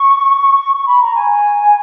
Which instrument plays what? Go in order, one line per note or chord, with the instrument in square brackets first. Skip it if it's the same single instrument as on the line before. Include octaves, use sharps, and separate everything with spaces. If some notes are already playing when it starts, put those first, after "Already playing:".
Already playing: [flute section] C#6
C#6
B5
A#5
G#5